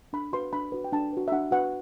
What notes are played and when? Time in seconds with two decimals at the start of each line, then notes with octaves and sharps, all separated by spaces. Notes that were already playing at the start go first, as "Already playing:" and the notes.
0.13 D4 B5
0.33 F#4 B4 C6
0.53 D4 B5
0.72 F#4 B4
0.84 G5
0.92 D4 A5
1.13 F#4 B4
1.28 E5
1.32 D4 F#5
1.51 F#4 B4 F#5